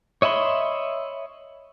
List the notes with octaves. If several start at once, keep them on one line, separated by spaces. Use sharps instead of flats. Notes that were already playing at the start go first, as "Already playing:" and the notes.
C#5 D#5 E5 B5 C6